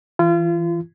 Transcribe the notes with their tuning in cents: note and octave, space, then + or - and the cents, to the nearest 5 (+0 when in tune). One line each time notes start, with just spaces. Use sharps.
E3 +0 F4 -35